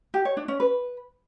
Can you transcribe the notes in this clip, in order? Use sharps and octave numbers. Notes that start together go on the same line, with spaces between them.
G4
C#5
D4
C#4
B4